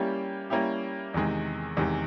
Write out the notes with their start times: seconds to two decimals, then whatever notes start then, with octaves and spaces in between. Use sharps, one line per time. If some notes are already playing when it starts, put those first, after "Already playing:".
Already playing: G3 A#3 C#4 E4 G4
0.50 G3 A#3 C#4 E4 G4
1.14 E2 C3 D#3 G#3
1.77 E2 C3 D#3 G#3